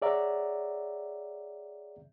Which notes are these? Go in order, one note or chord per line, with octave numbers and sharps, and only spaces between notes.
G#4 C#5 D5 E5 F#5 A#5